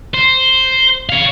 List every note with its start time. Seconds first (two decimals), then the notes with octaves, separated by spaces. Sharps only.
0.14 C5
1.09 C#5 F5